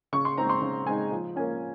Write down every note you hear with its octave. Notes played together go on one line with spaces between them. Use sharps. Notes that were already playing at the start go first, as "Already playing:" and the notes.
C#3 C#6
C6
G#3 C4 D#4 A#5
C6
C#3
G#3 C4 D#4 G#5
F3
A#3 C#4 G#5